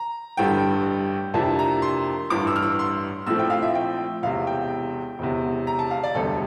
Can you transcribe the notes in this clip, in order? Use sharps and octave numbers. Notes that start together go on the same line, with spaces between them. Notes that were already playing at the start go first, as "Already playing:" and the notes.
Already playing: A#5
A1 G2 D3 G3 G5
F2 C3 E3 A#3 D4 A5
A#5
C6
A1 G2 E3 D6
E6
F6
E6
C6
A#1 A2 F3 A3 C4 E6
G5
F5
E5
G5
E1 E2 C3 F5
G5
E1 E2 C3
A#5
A5
F5
D5
E1 D2 C3 G3 A4